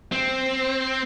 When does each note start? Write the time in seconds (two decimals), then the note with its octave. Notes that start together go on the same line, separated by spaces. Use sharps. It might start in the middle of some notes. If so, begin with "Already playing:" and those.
0.12 C4